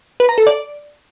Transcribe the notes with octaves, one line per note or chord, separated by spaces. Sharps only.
B4
A#5
A4
D5